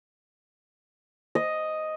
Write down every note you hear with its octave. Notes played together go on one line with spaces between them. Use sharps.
D#5